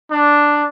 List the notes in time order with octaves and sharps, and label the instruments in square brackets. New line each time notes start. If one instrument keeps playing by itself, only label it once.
[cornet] D4